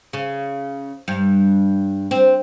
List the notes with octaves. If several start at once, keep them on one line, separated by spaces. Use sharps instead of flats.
C#3
G2
C4